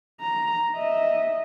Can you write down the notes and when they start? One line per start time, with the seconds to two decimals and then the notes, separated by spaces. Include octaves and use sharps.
0.21 A#5
0.76 D#5 E5